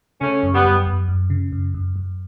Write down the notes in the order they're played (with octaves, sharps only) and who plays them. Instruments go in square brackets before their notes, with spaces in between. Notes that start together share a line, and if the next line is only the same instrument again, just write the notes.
[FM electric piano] C#3 [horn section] A3 C#4
[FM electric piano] F#2
[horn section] G3 B3
[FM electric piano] F#2
F#2
F#2
C#3
F#2
F#2
F#2